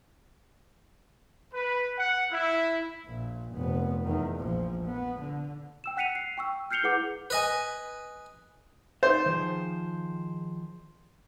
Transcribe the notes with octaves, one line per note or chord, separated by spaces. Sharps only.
B4
F#5
E4
A#1 A#2
F1 B3
E2 D#3
A#1 F3
B3
D3
G5 E6 E7
F#5 F#6 B6 C#7 D#7 F7
C7
G5 C#6 E6
F6 G6 C7 C#7 F7 G7
E4 G#4 B4 F#5 D6 G6
B4 D#5 G#5
D#4 C5 D5 E5
D#3 F3 G#4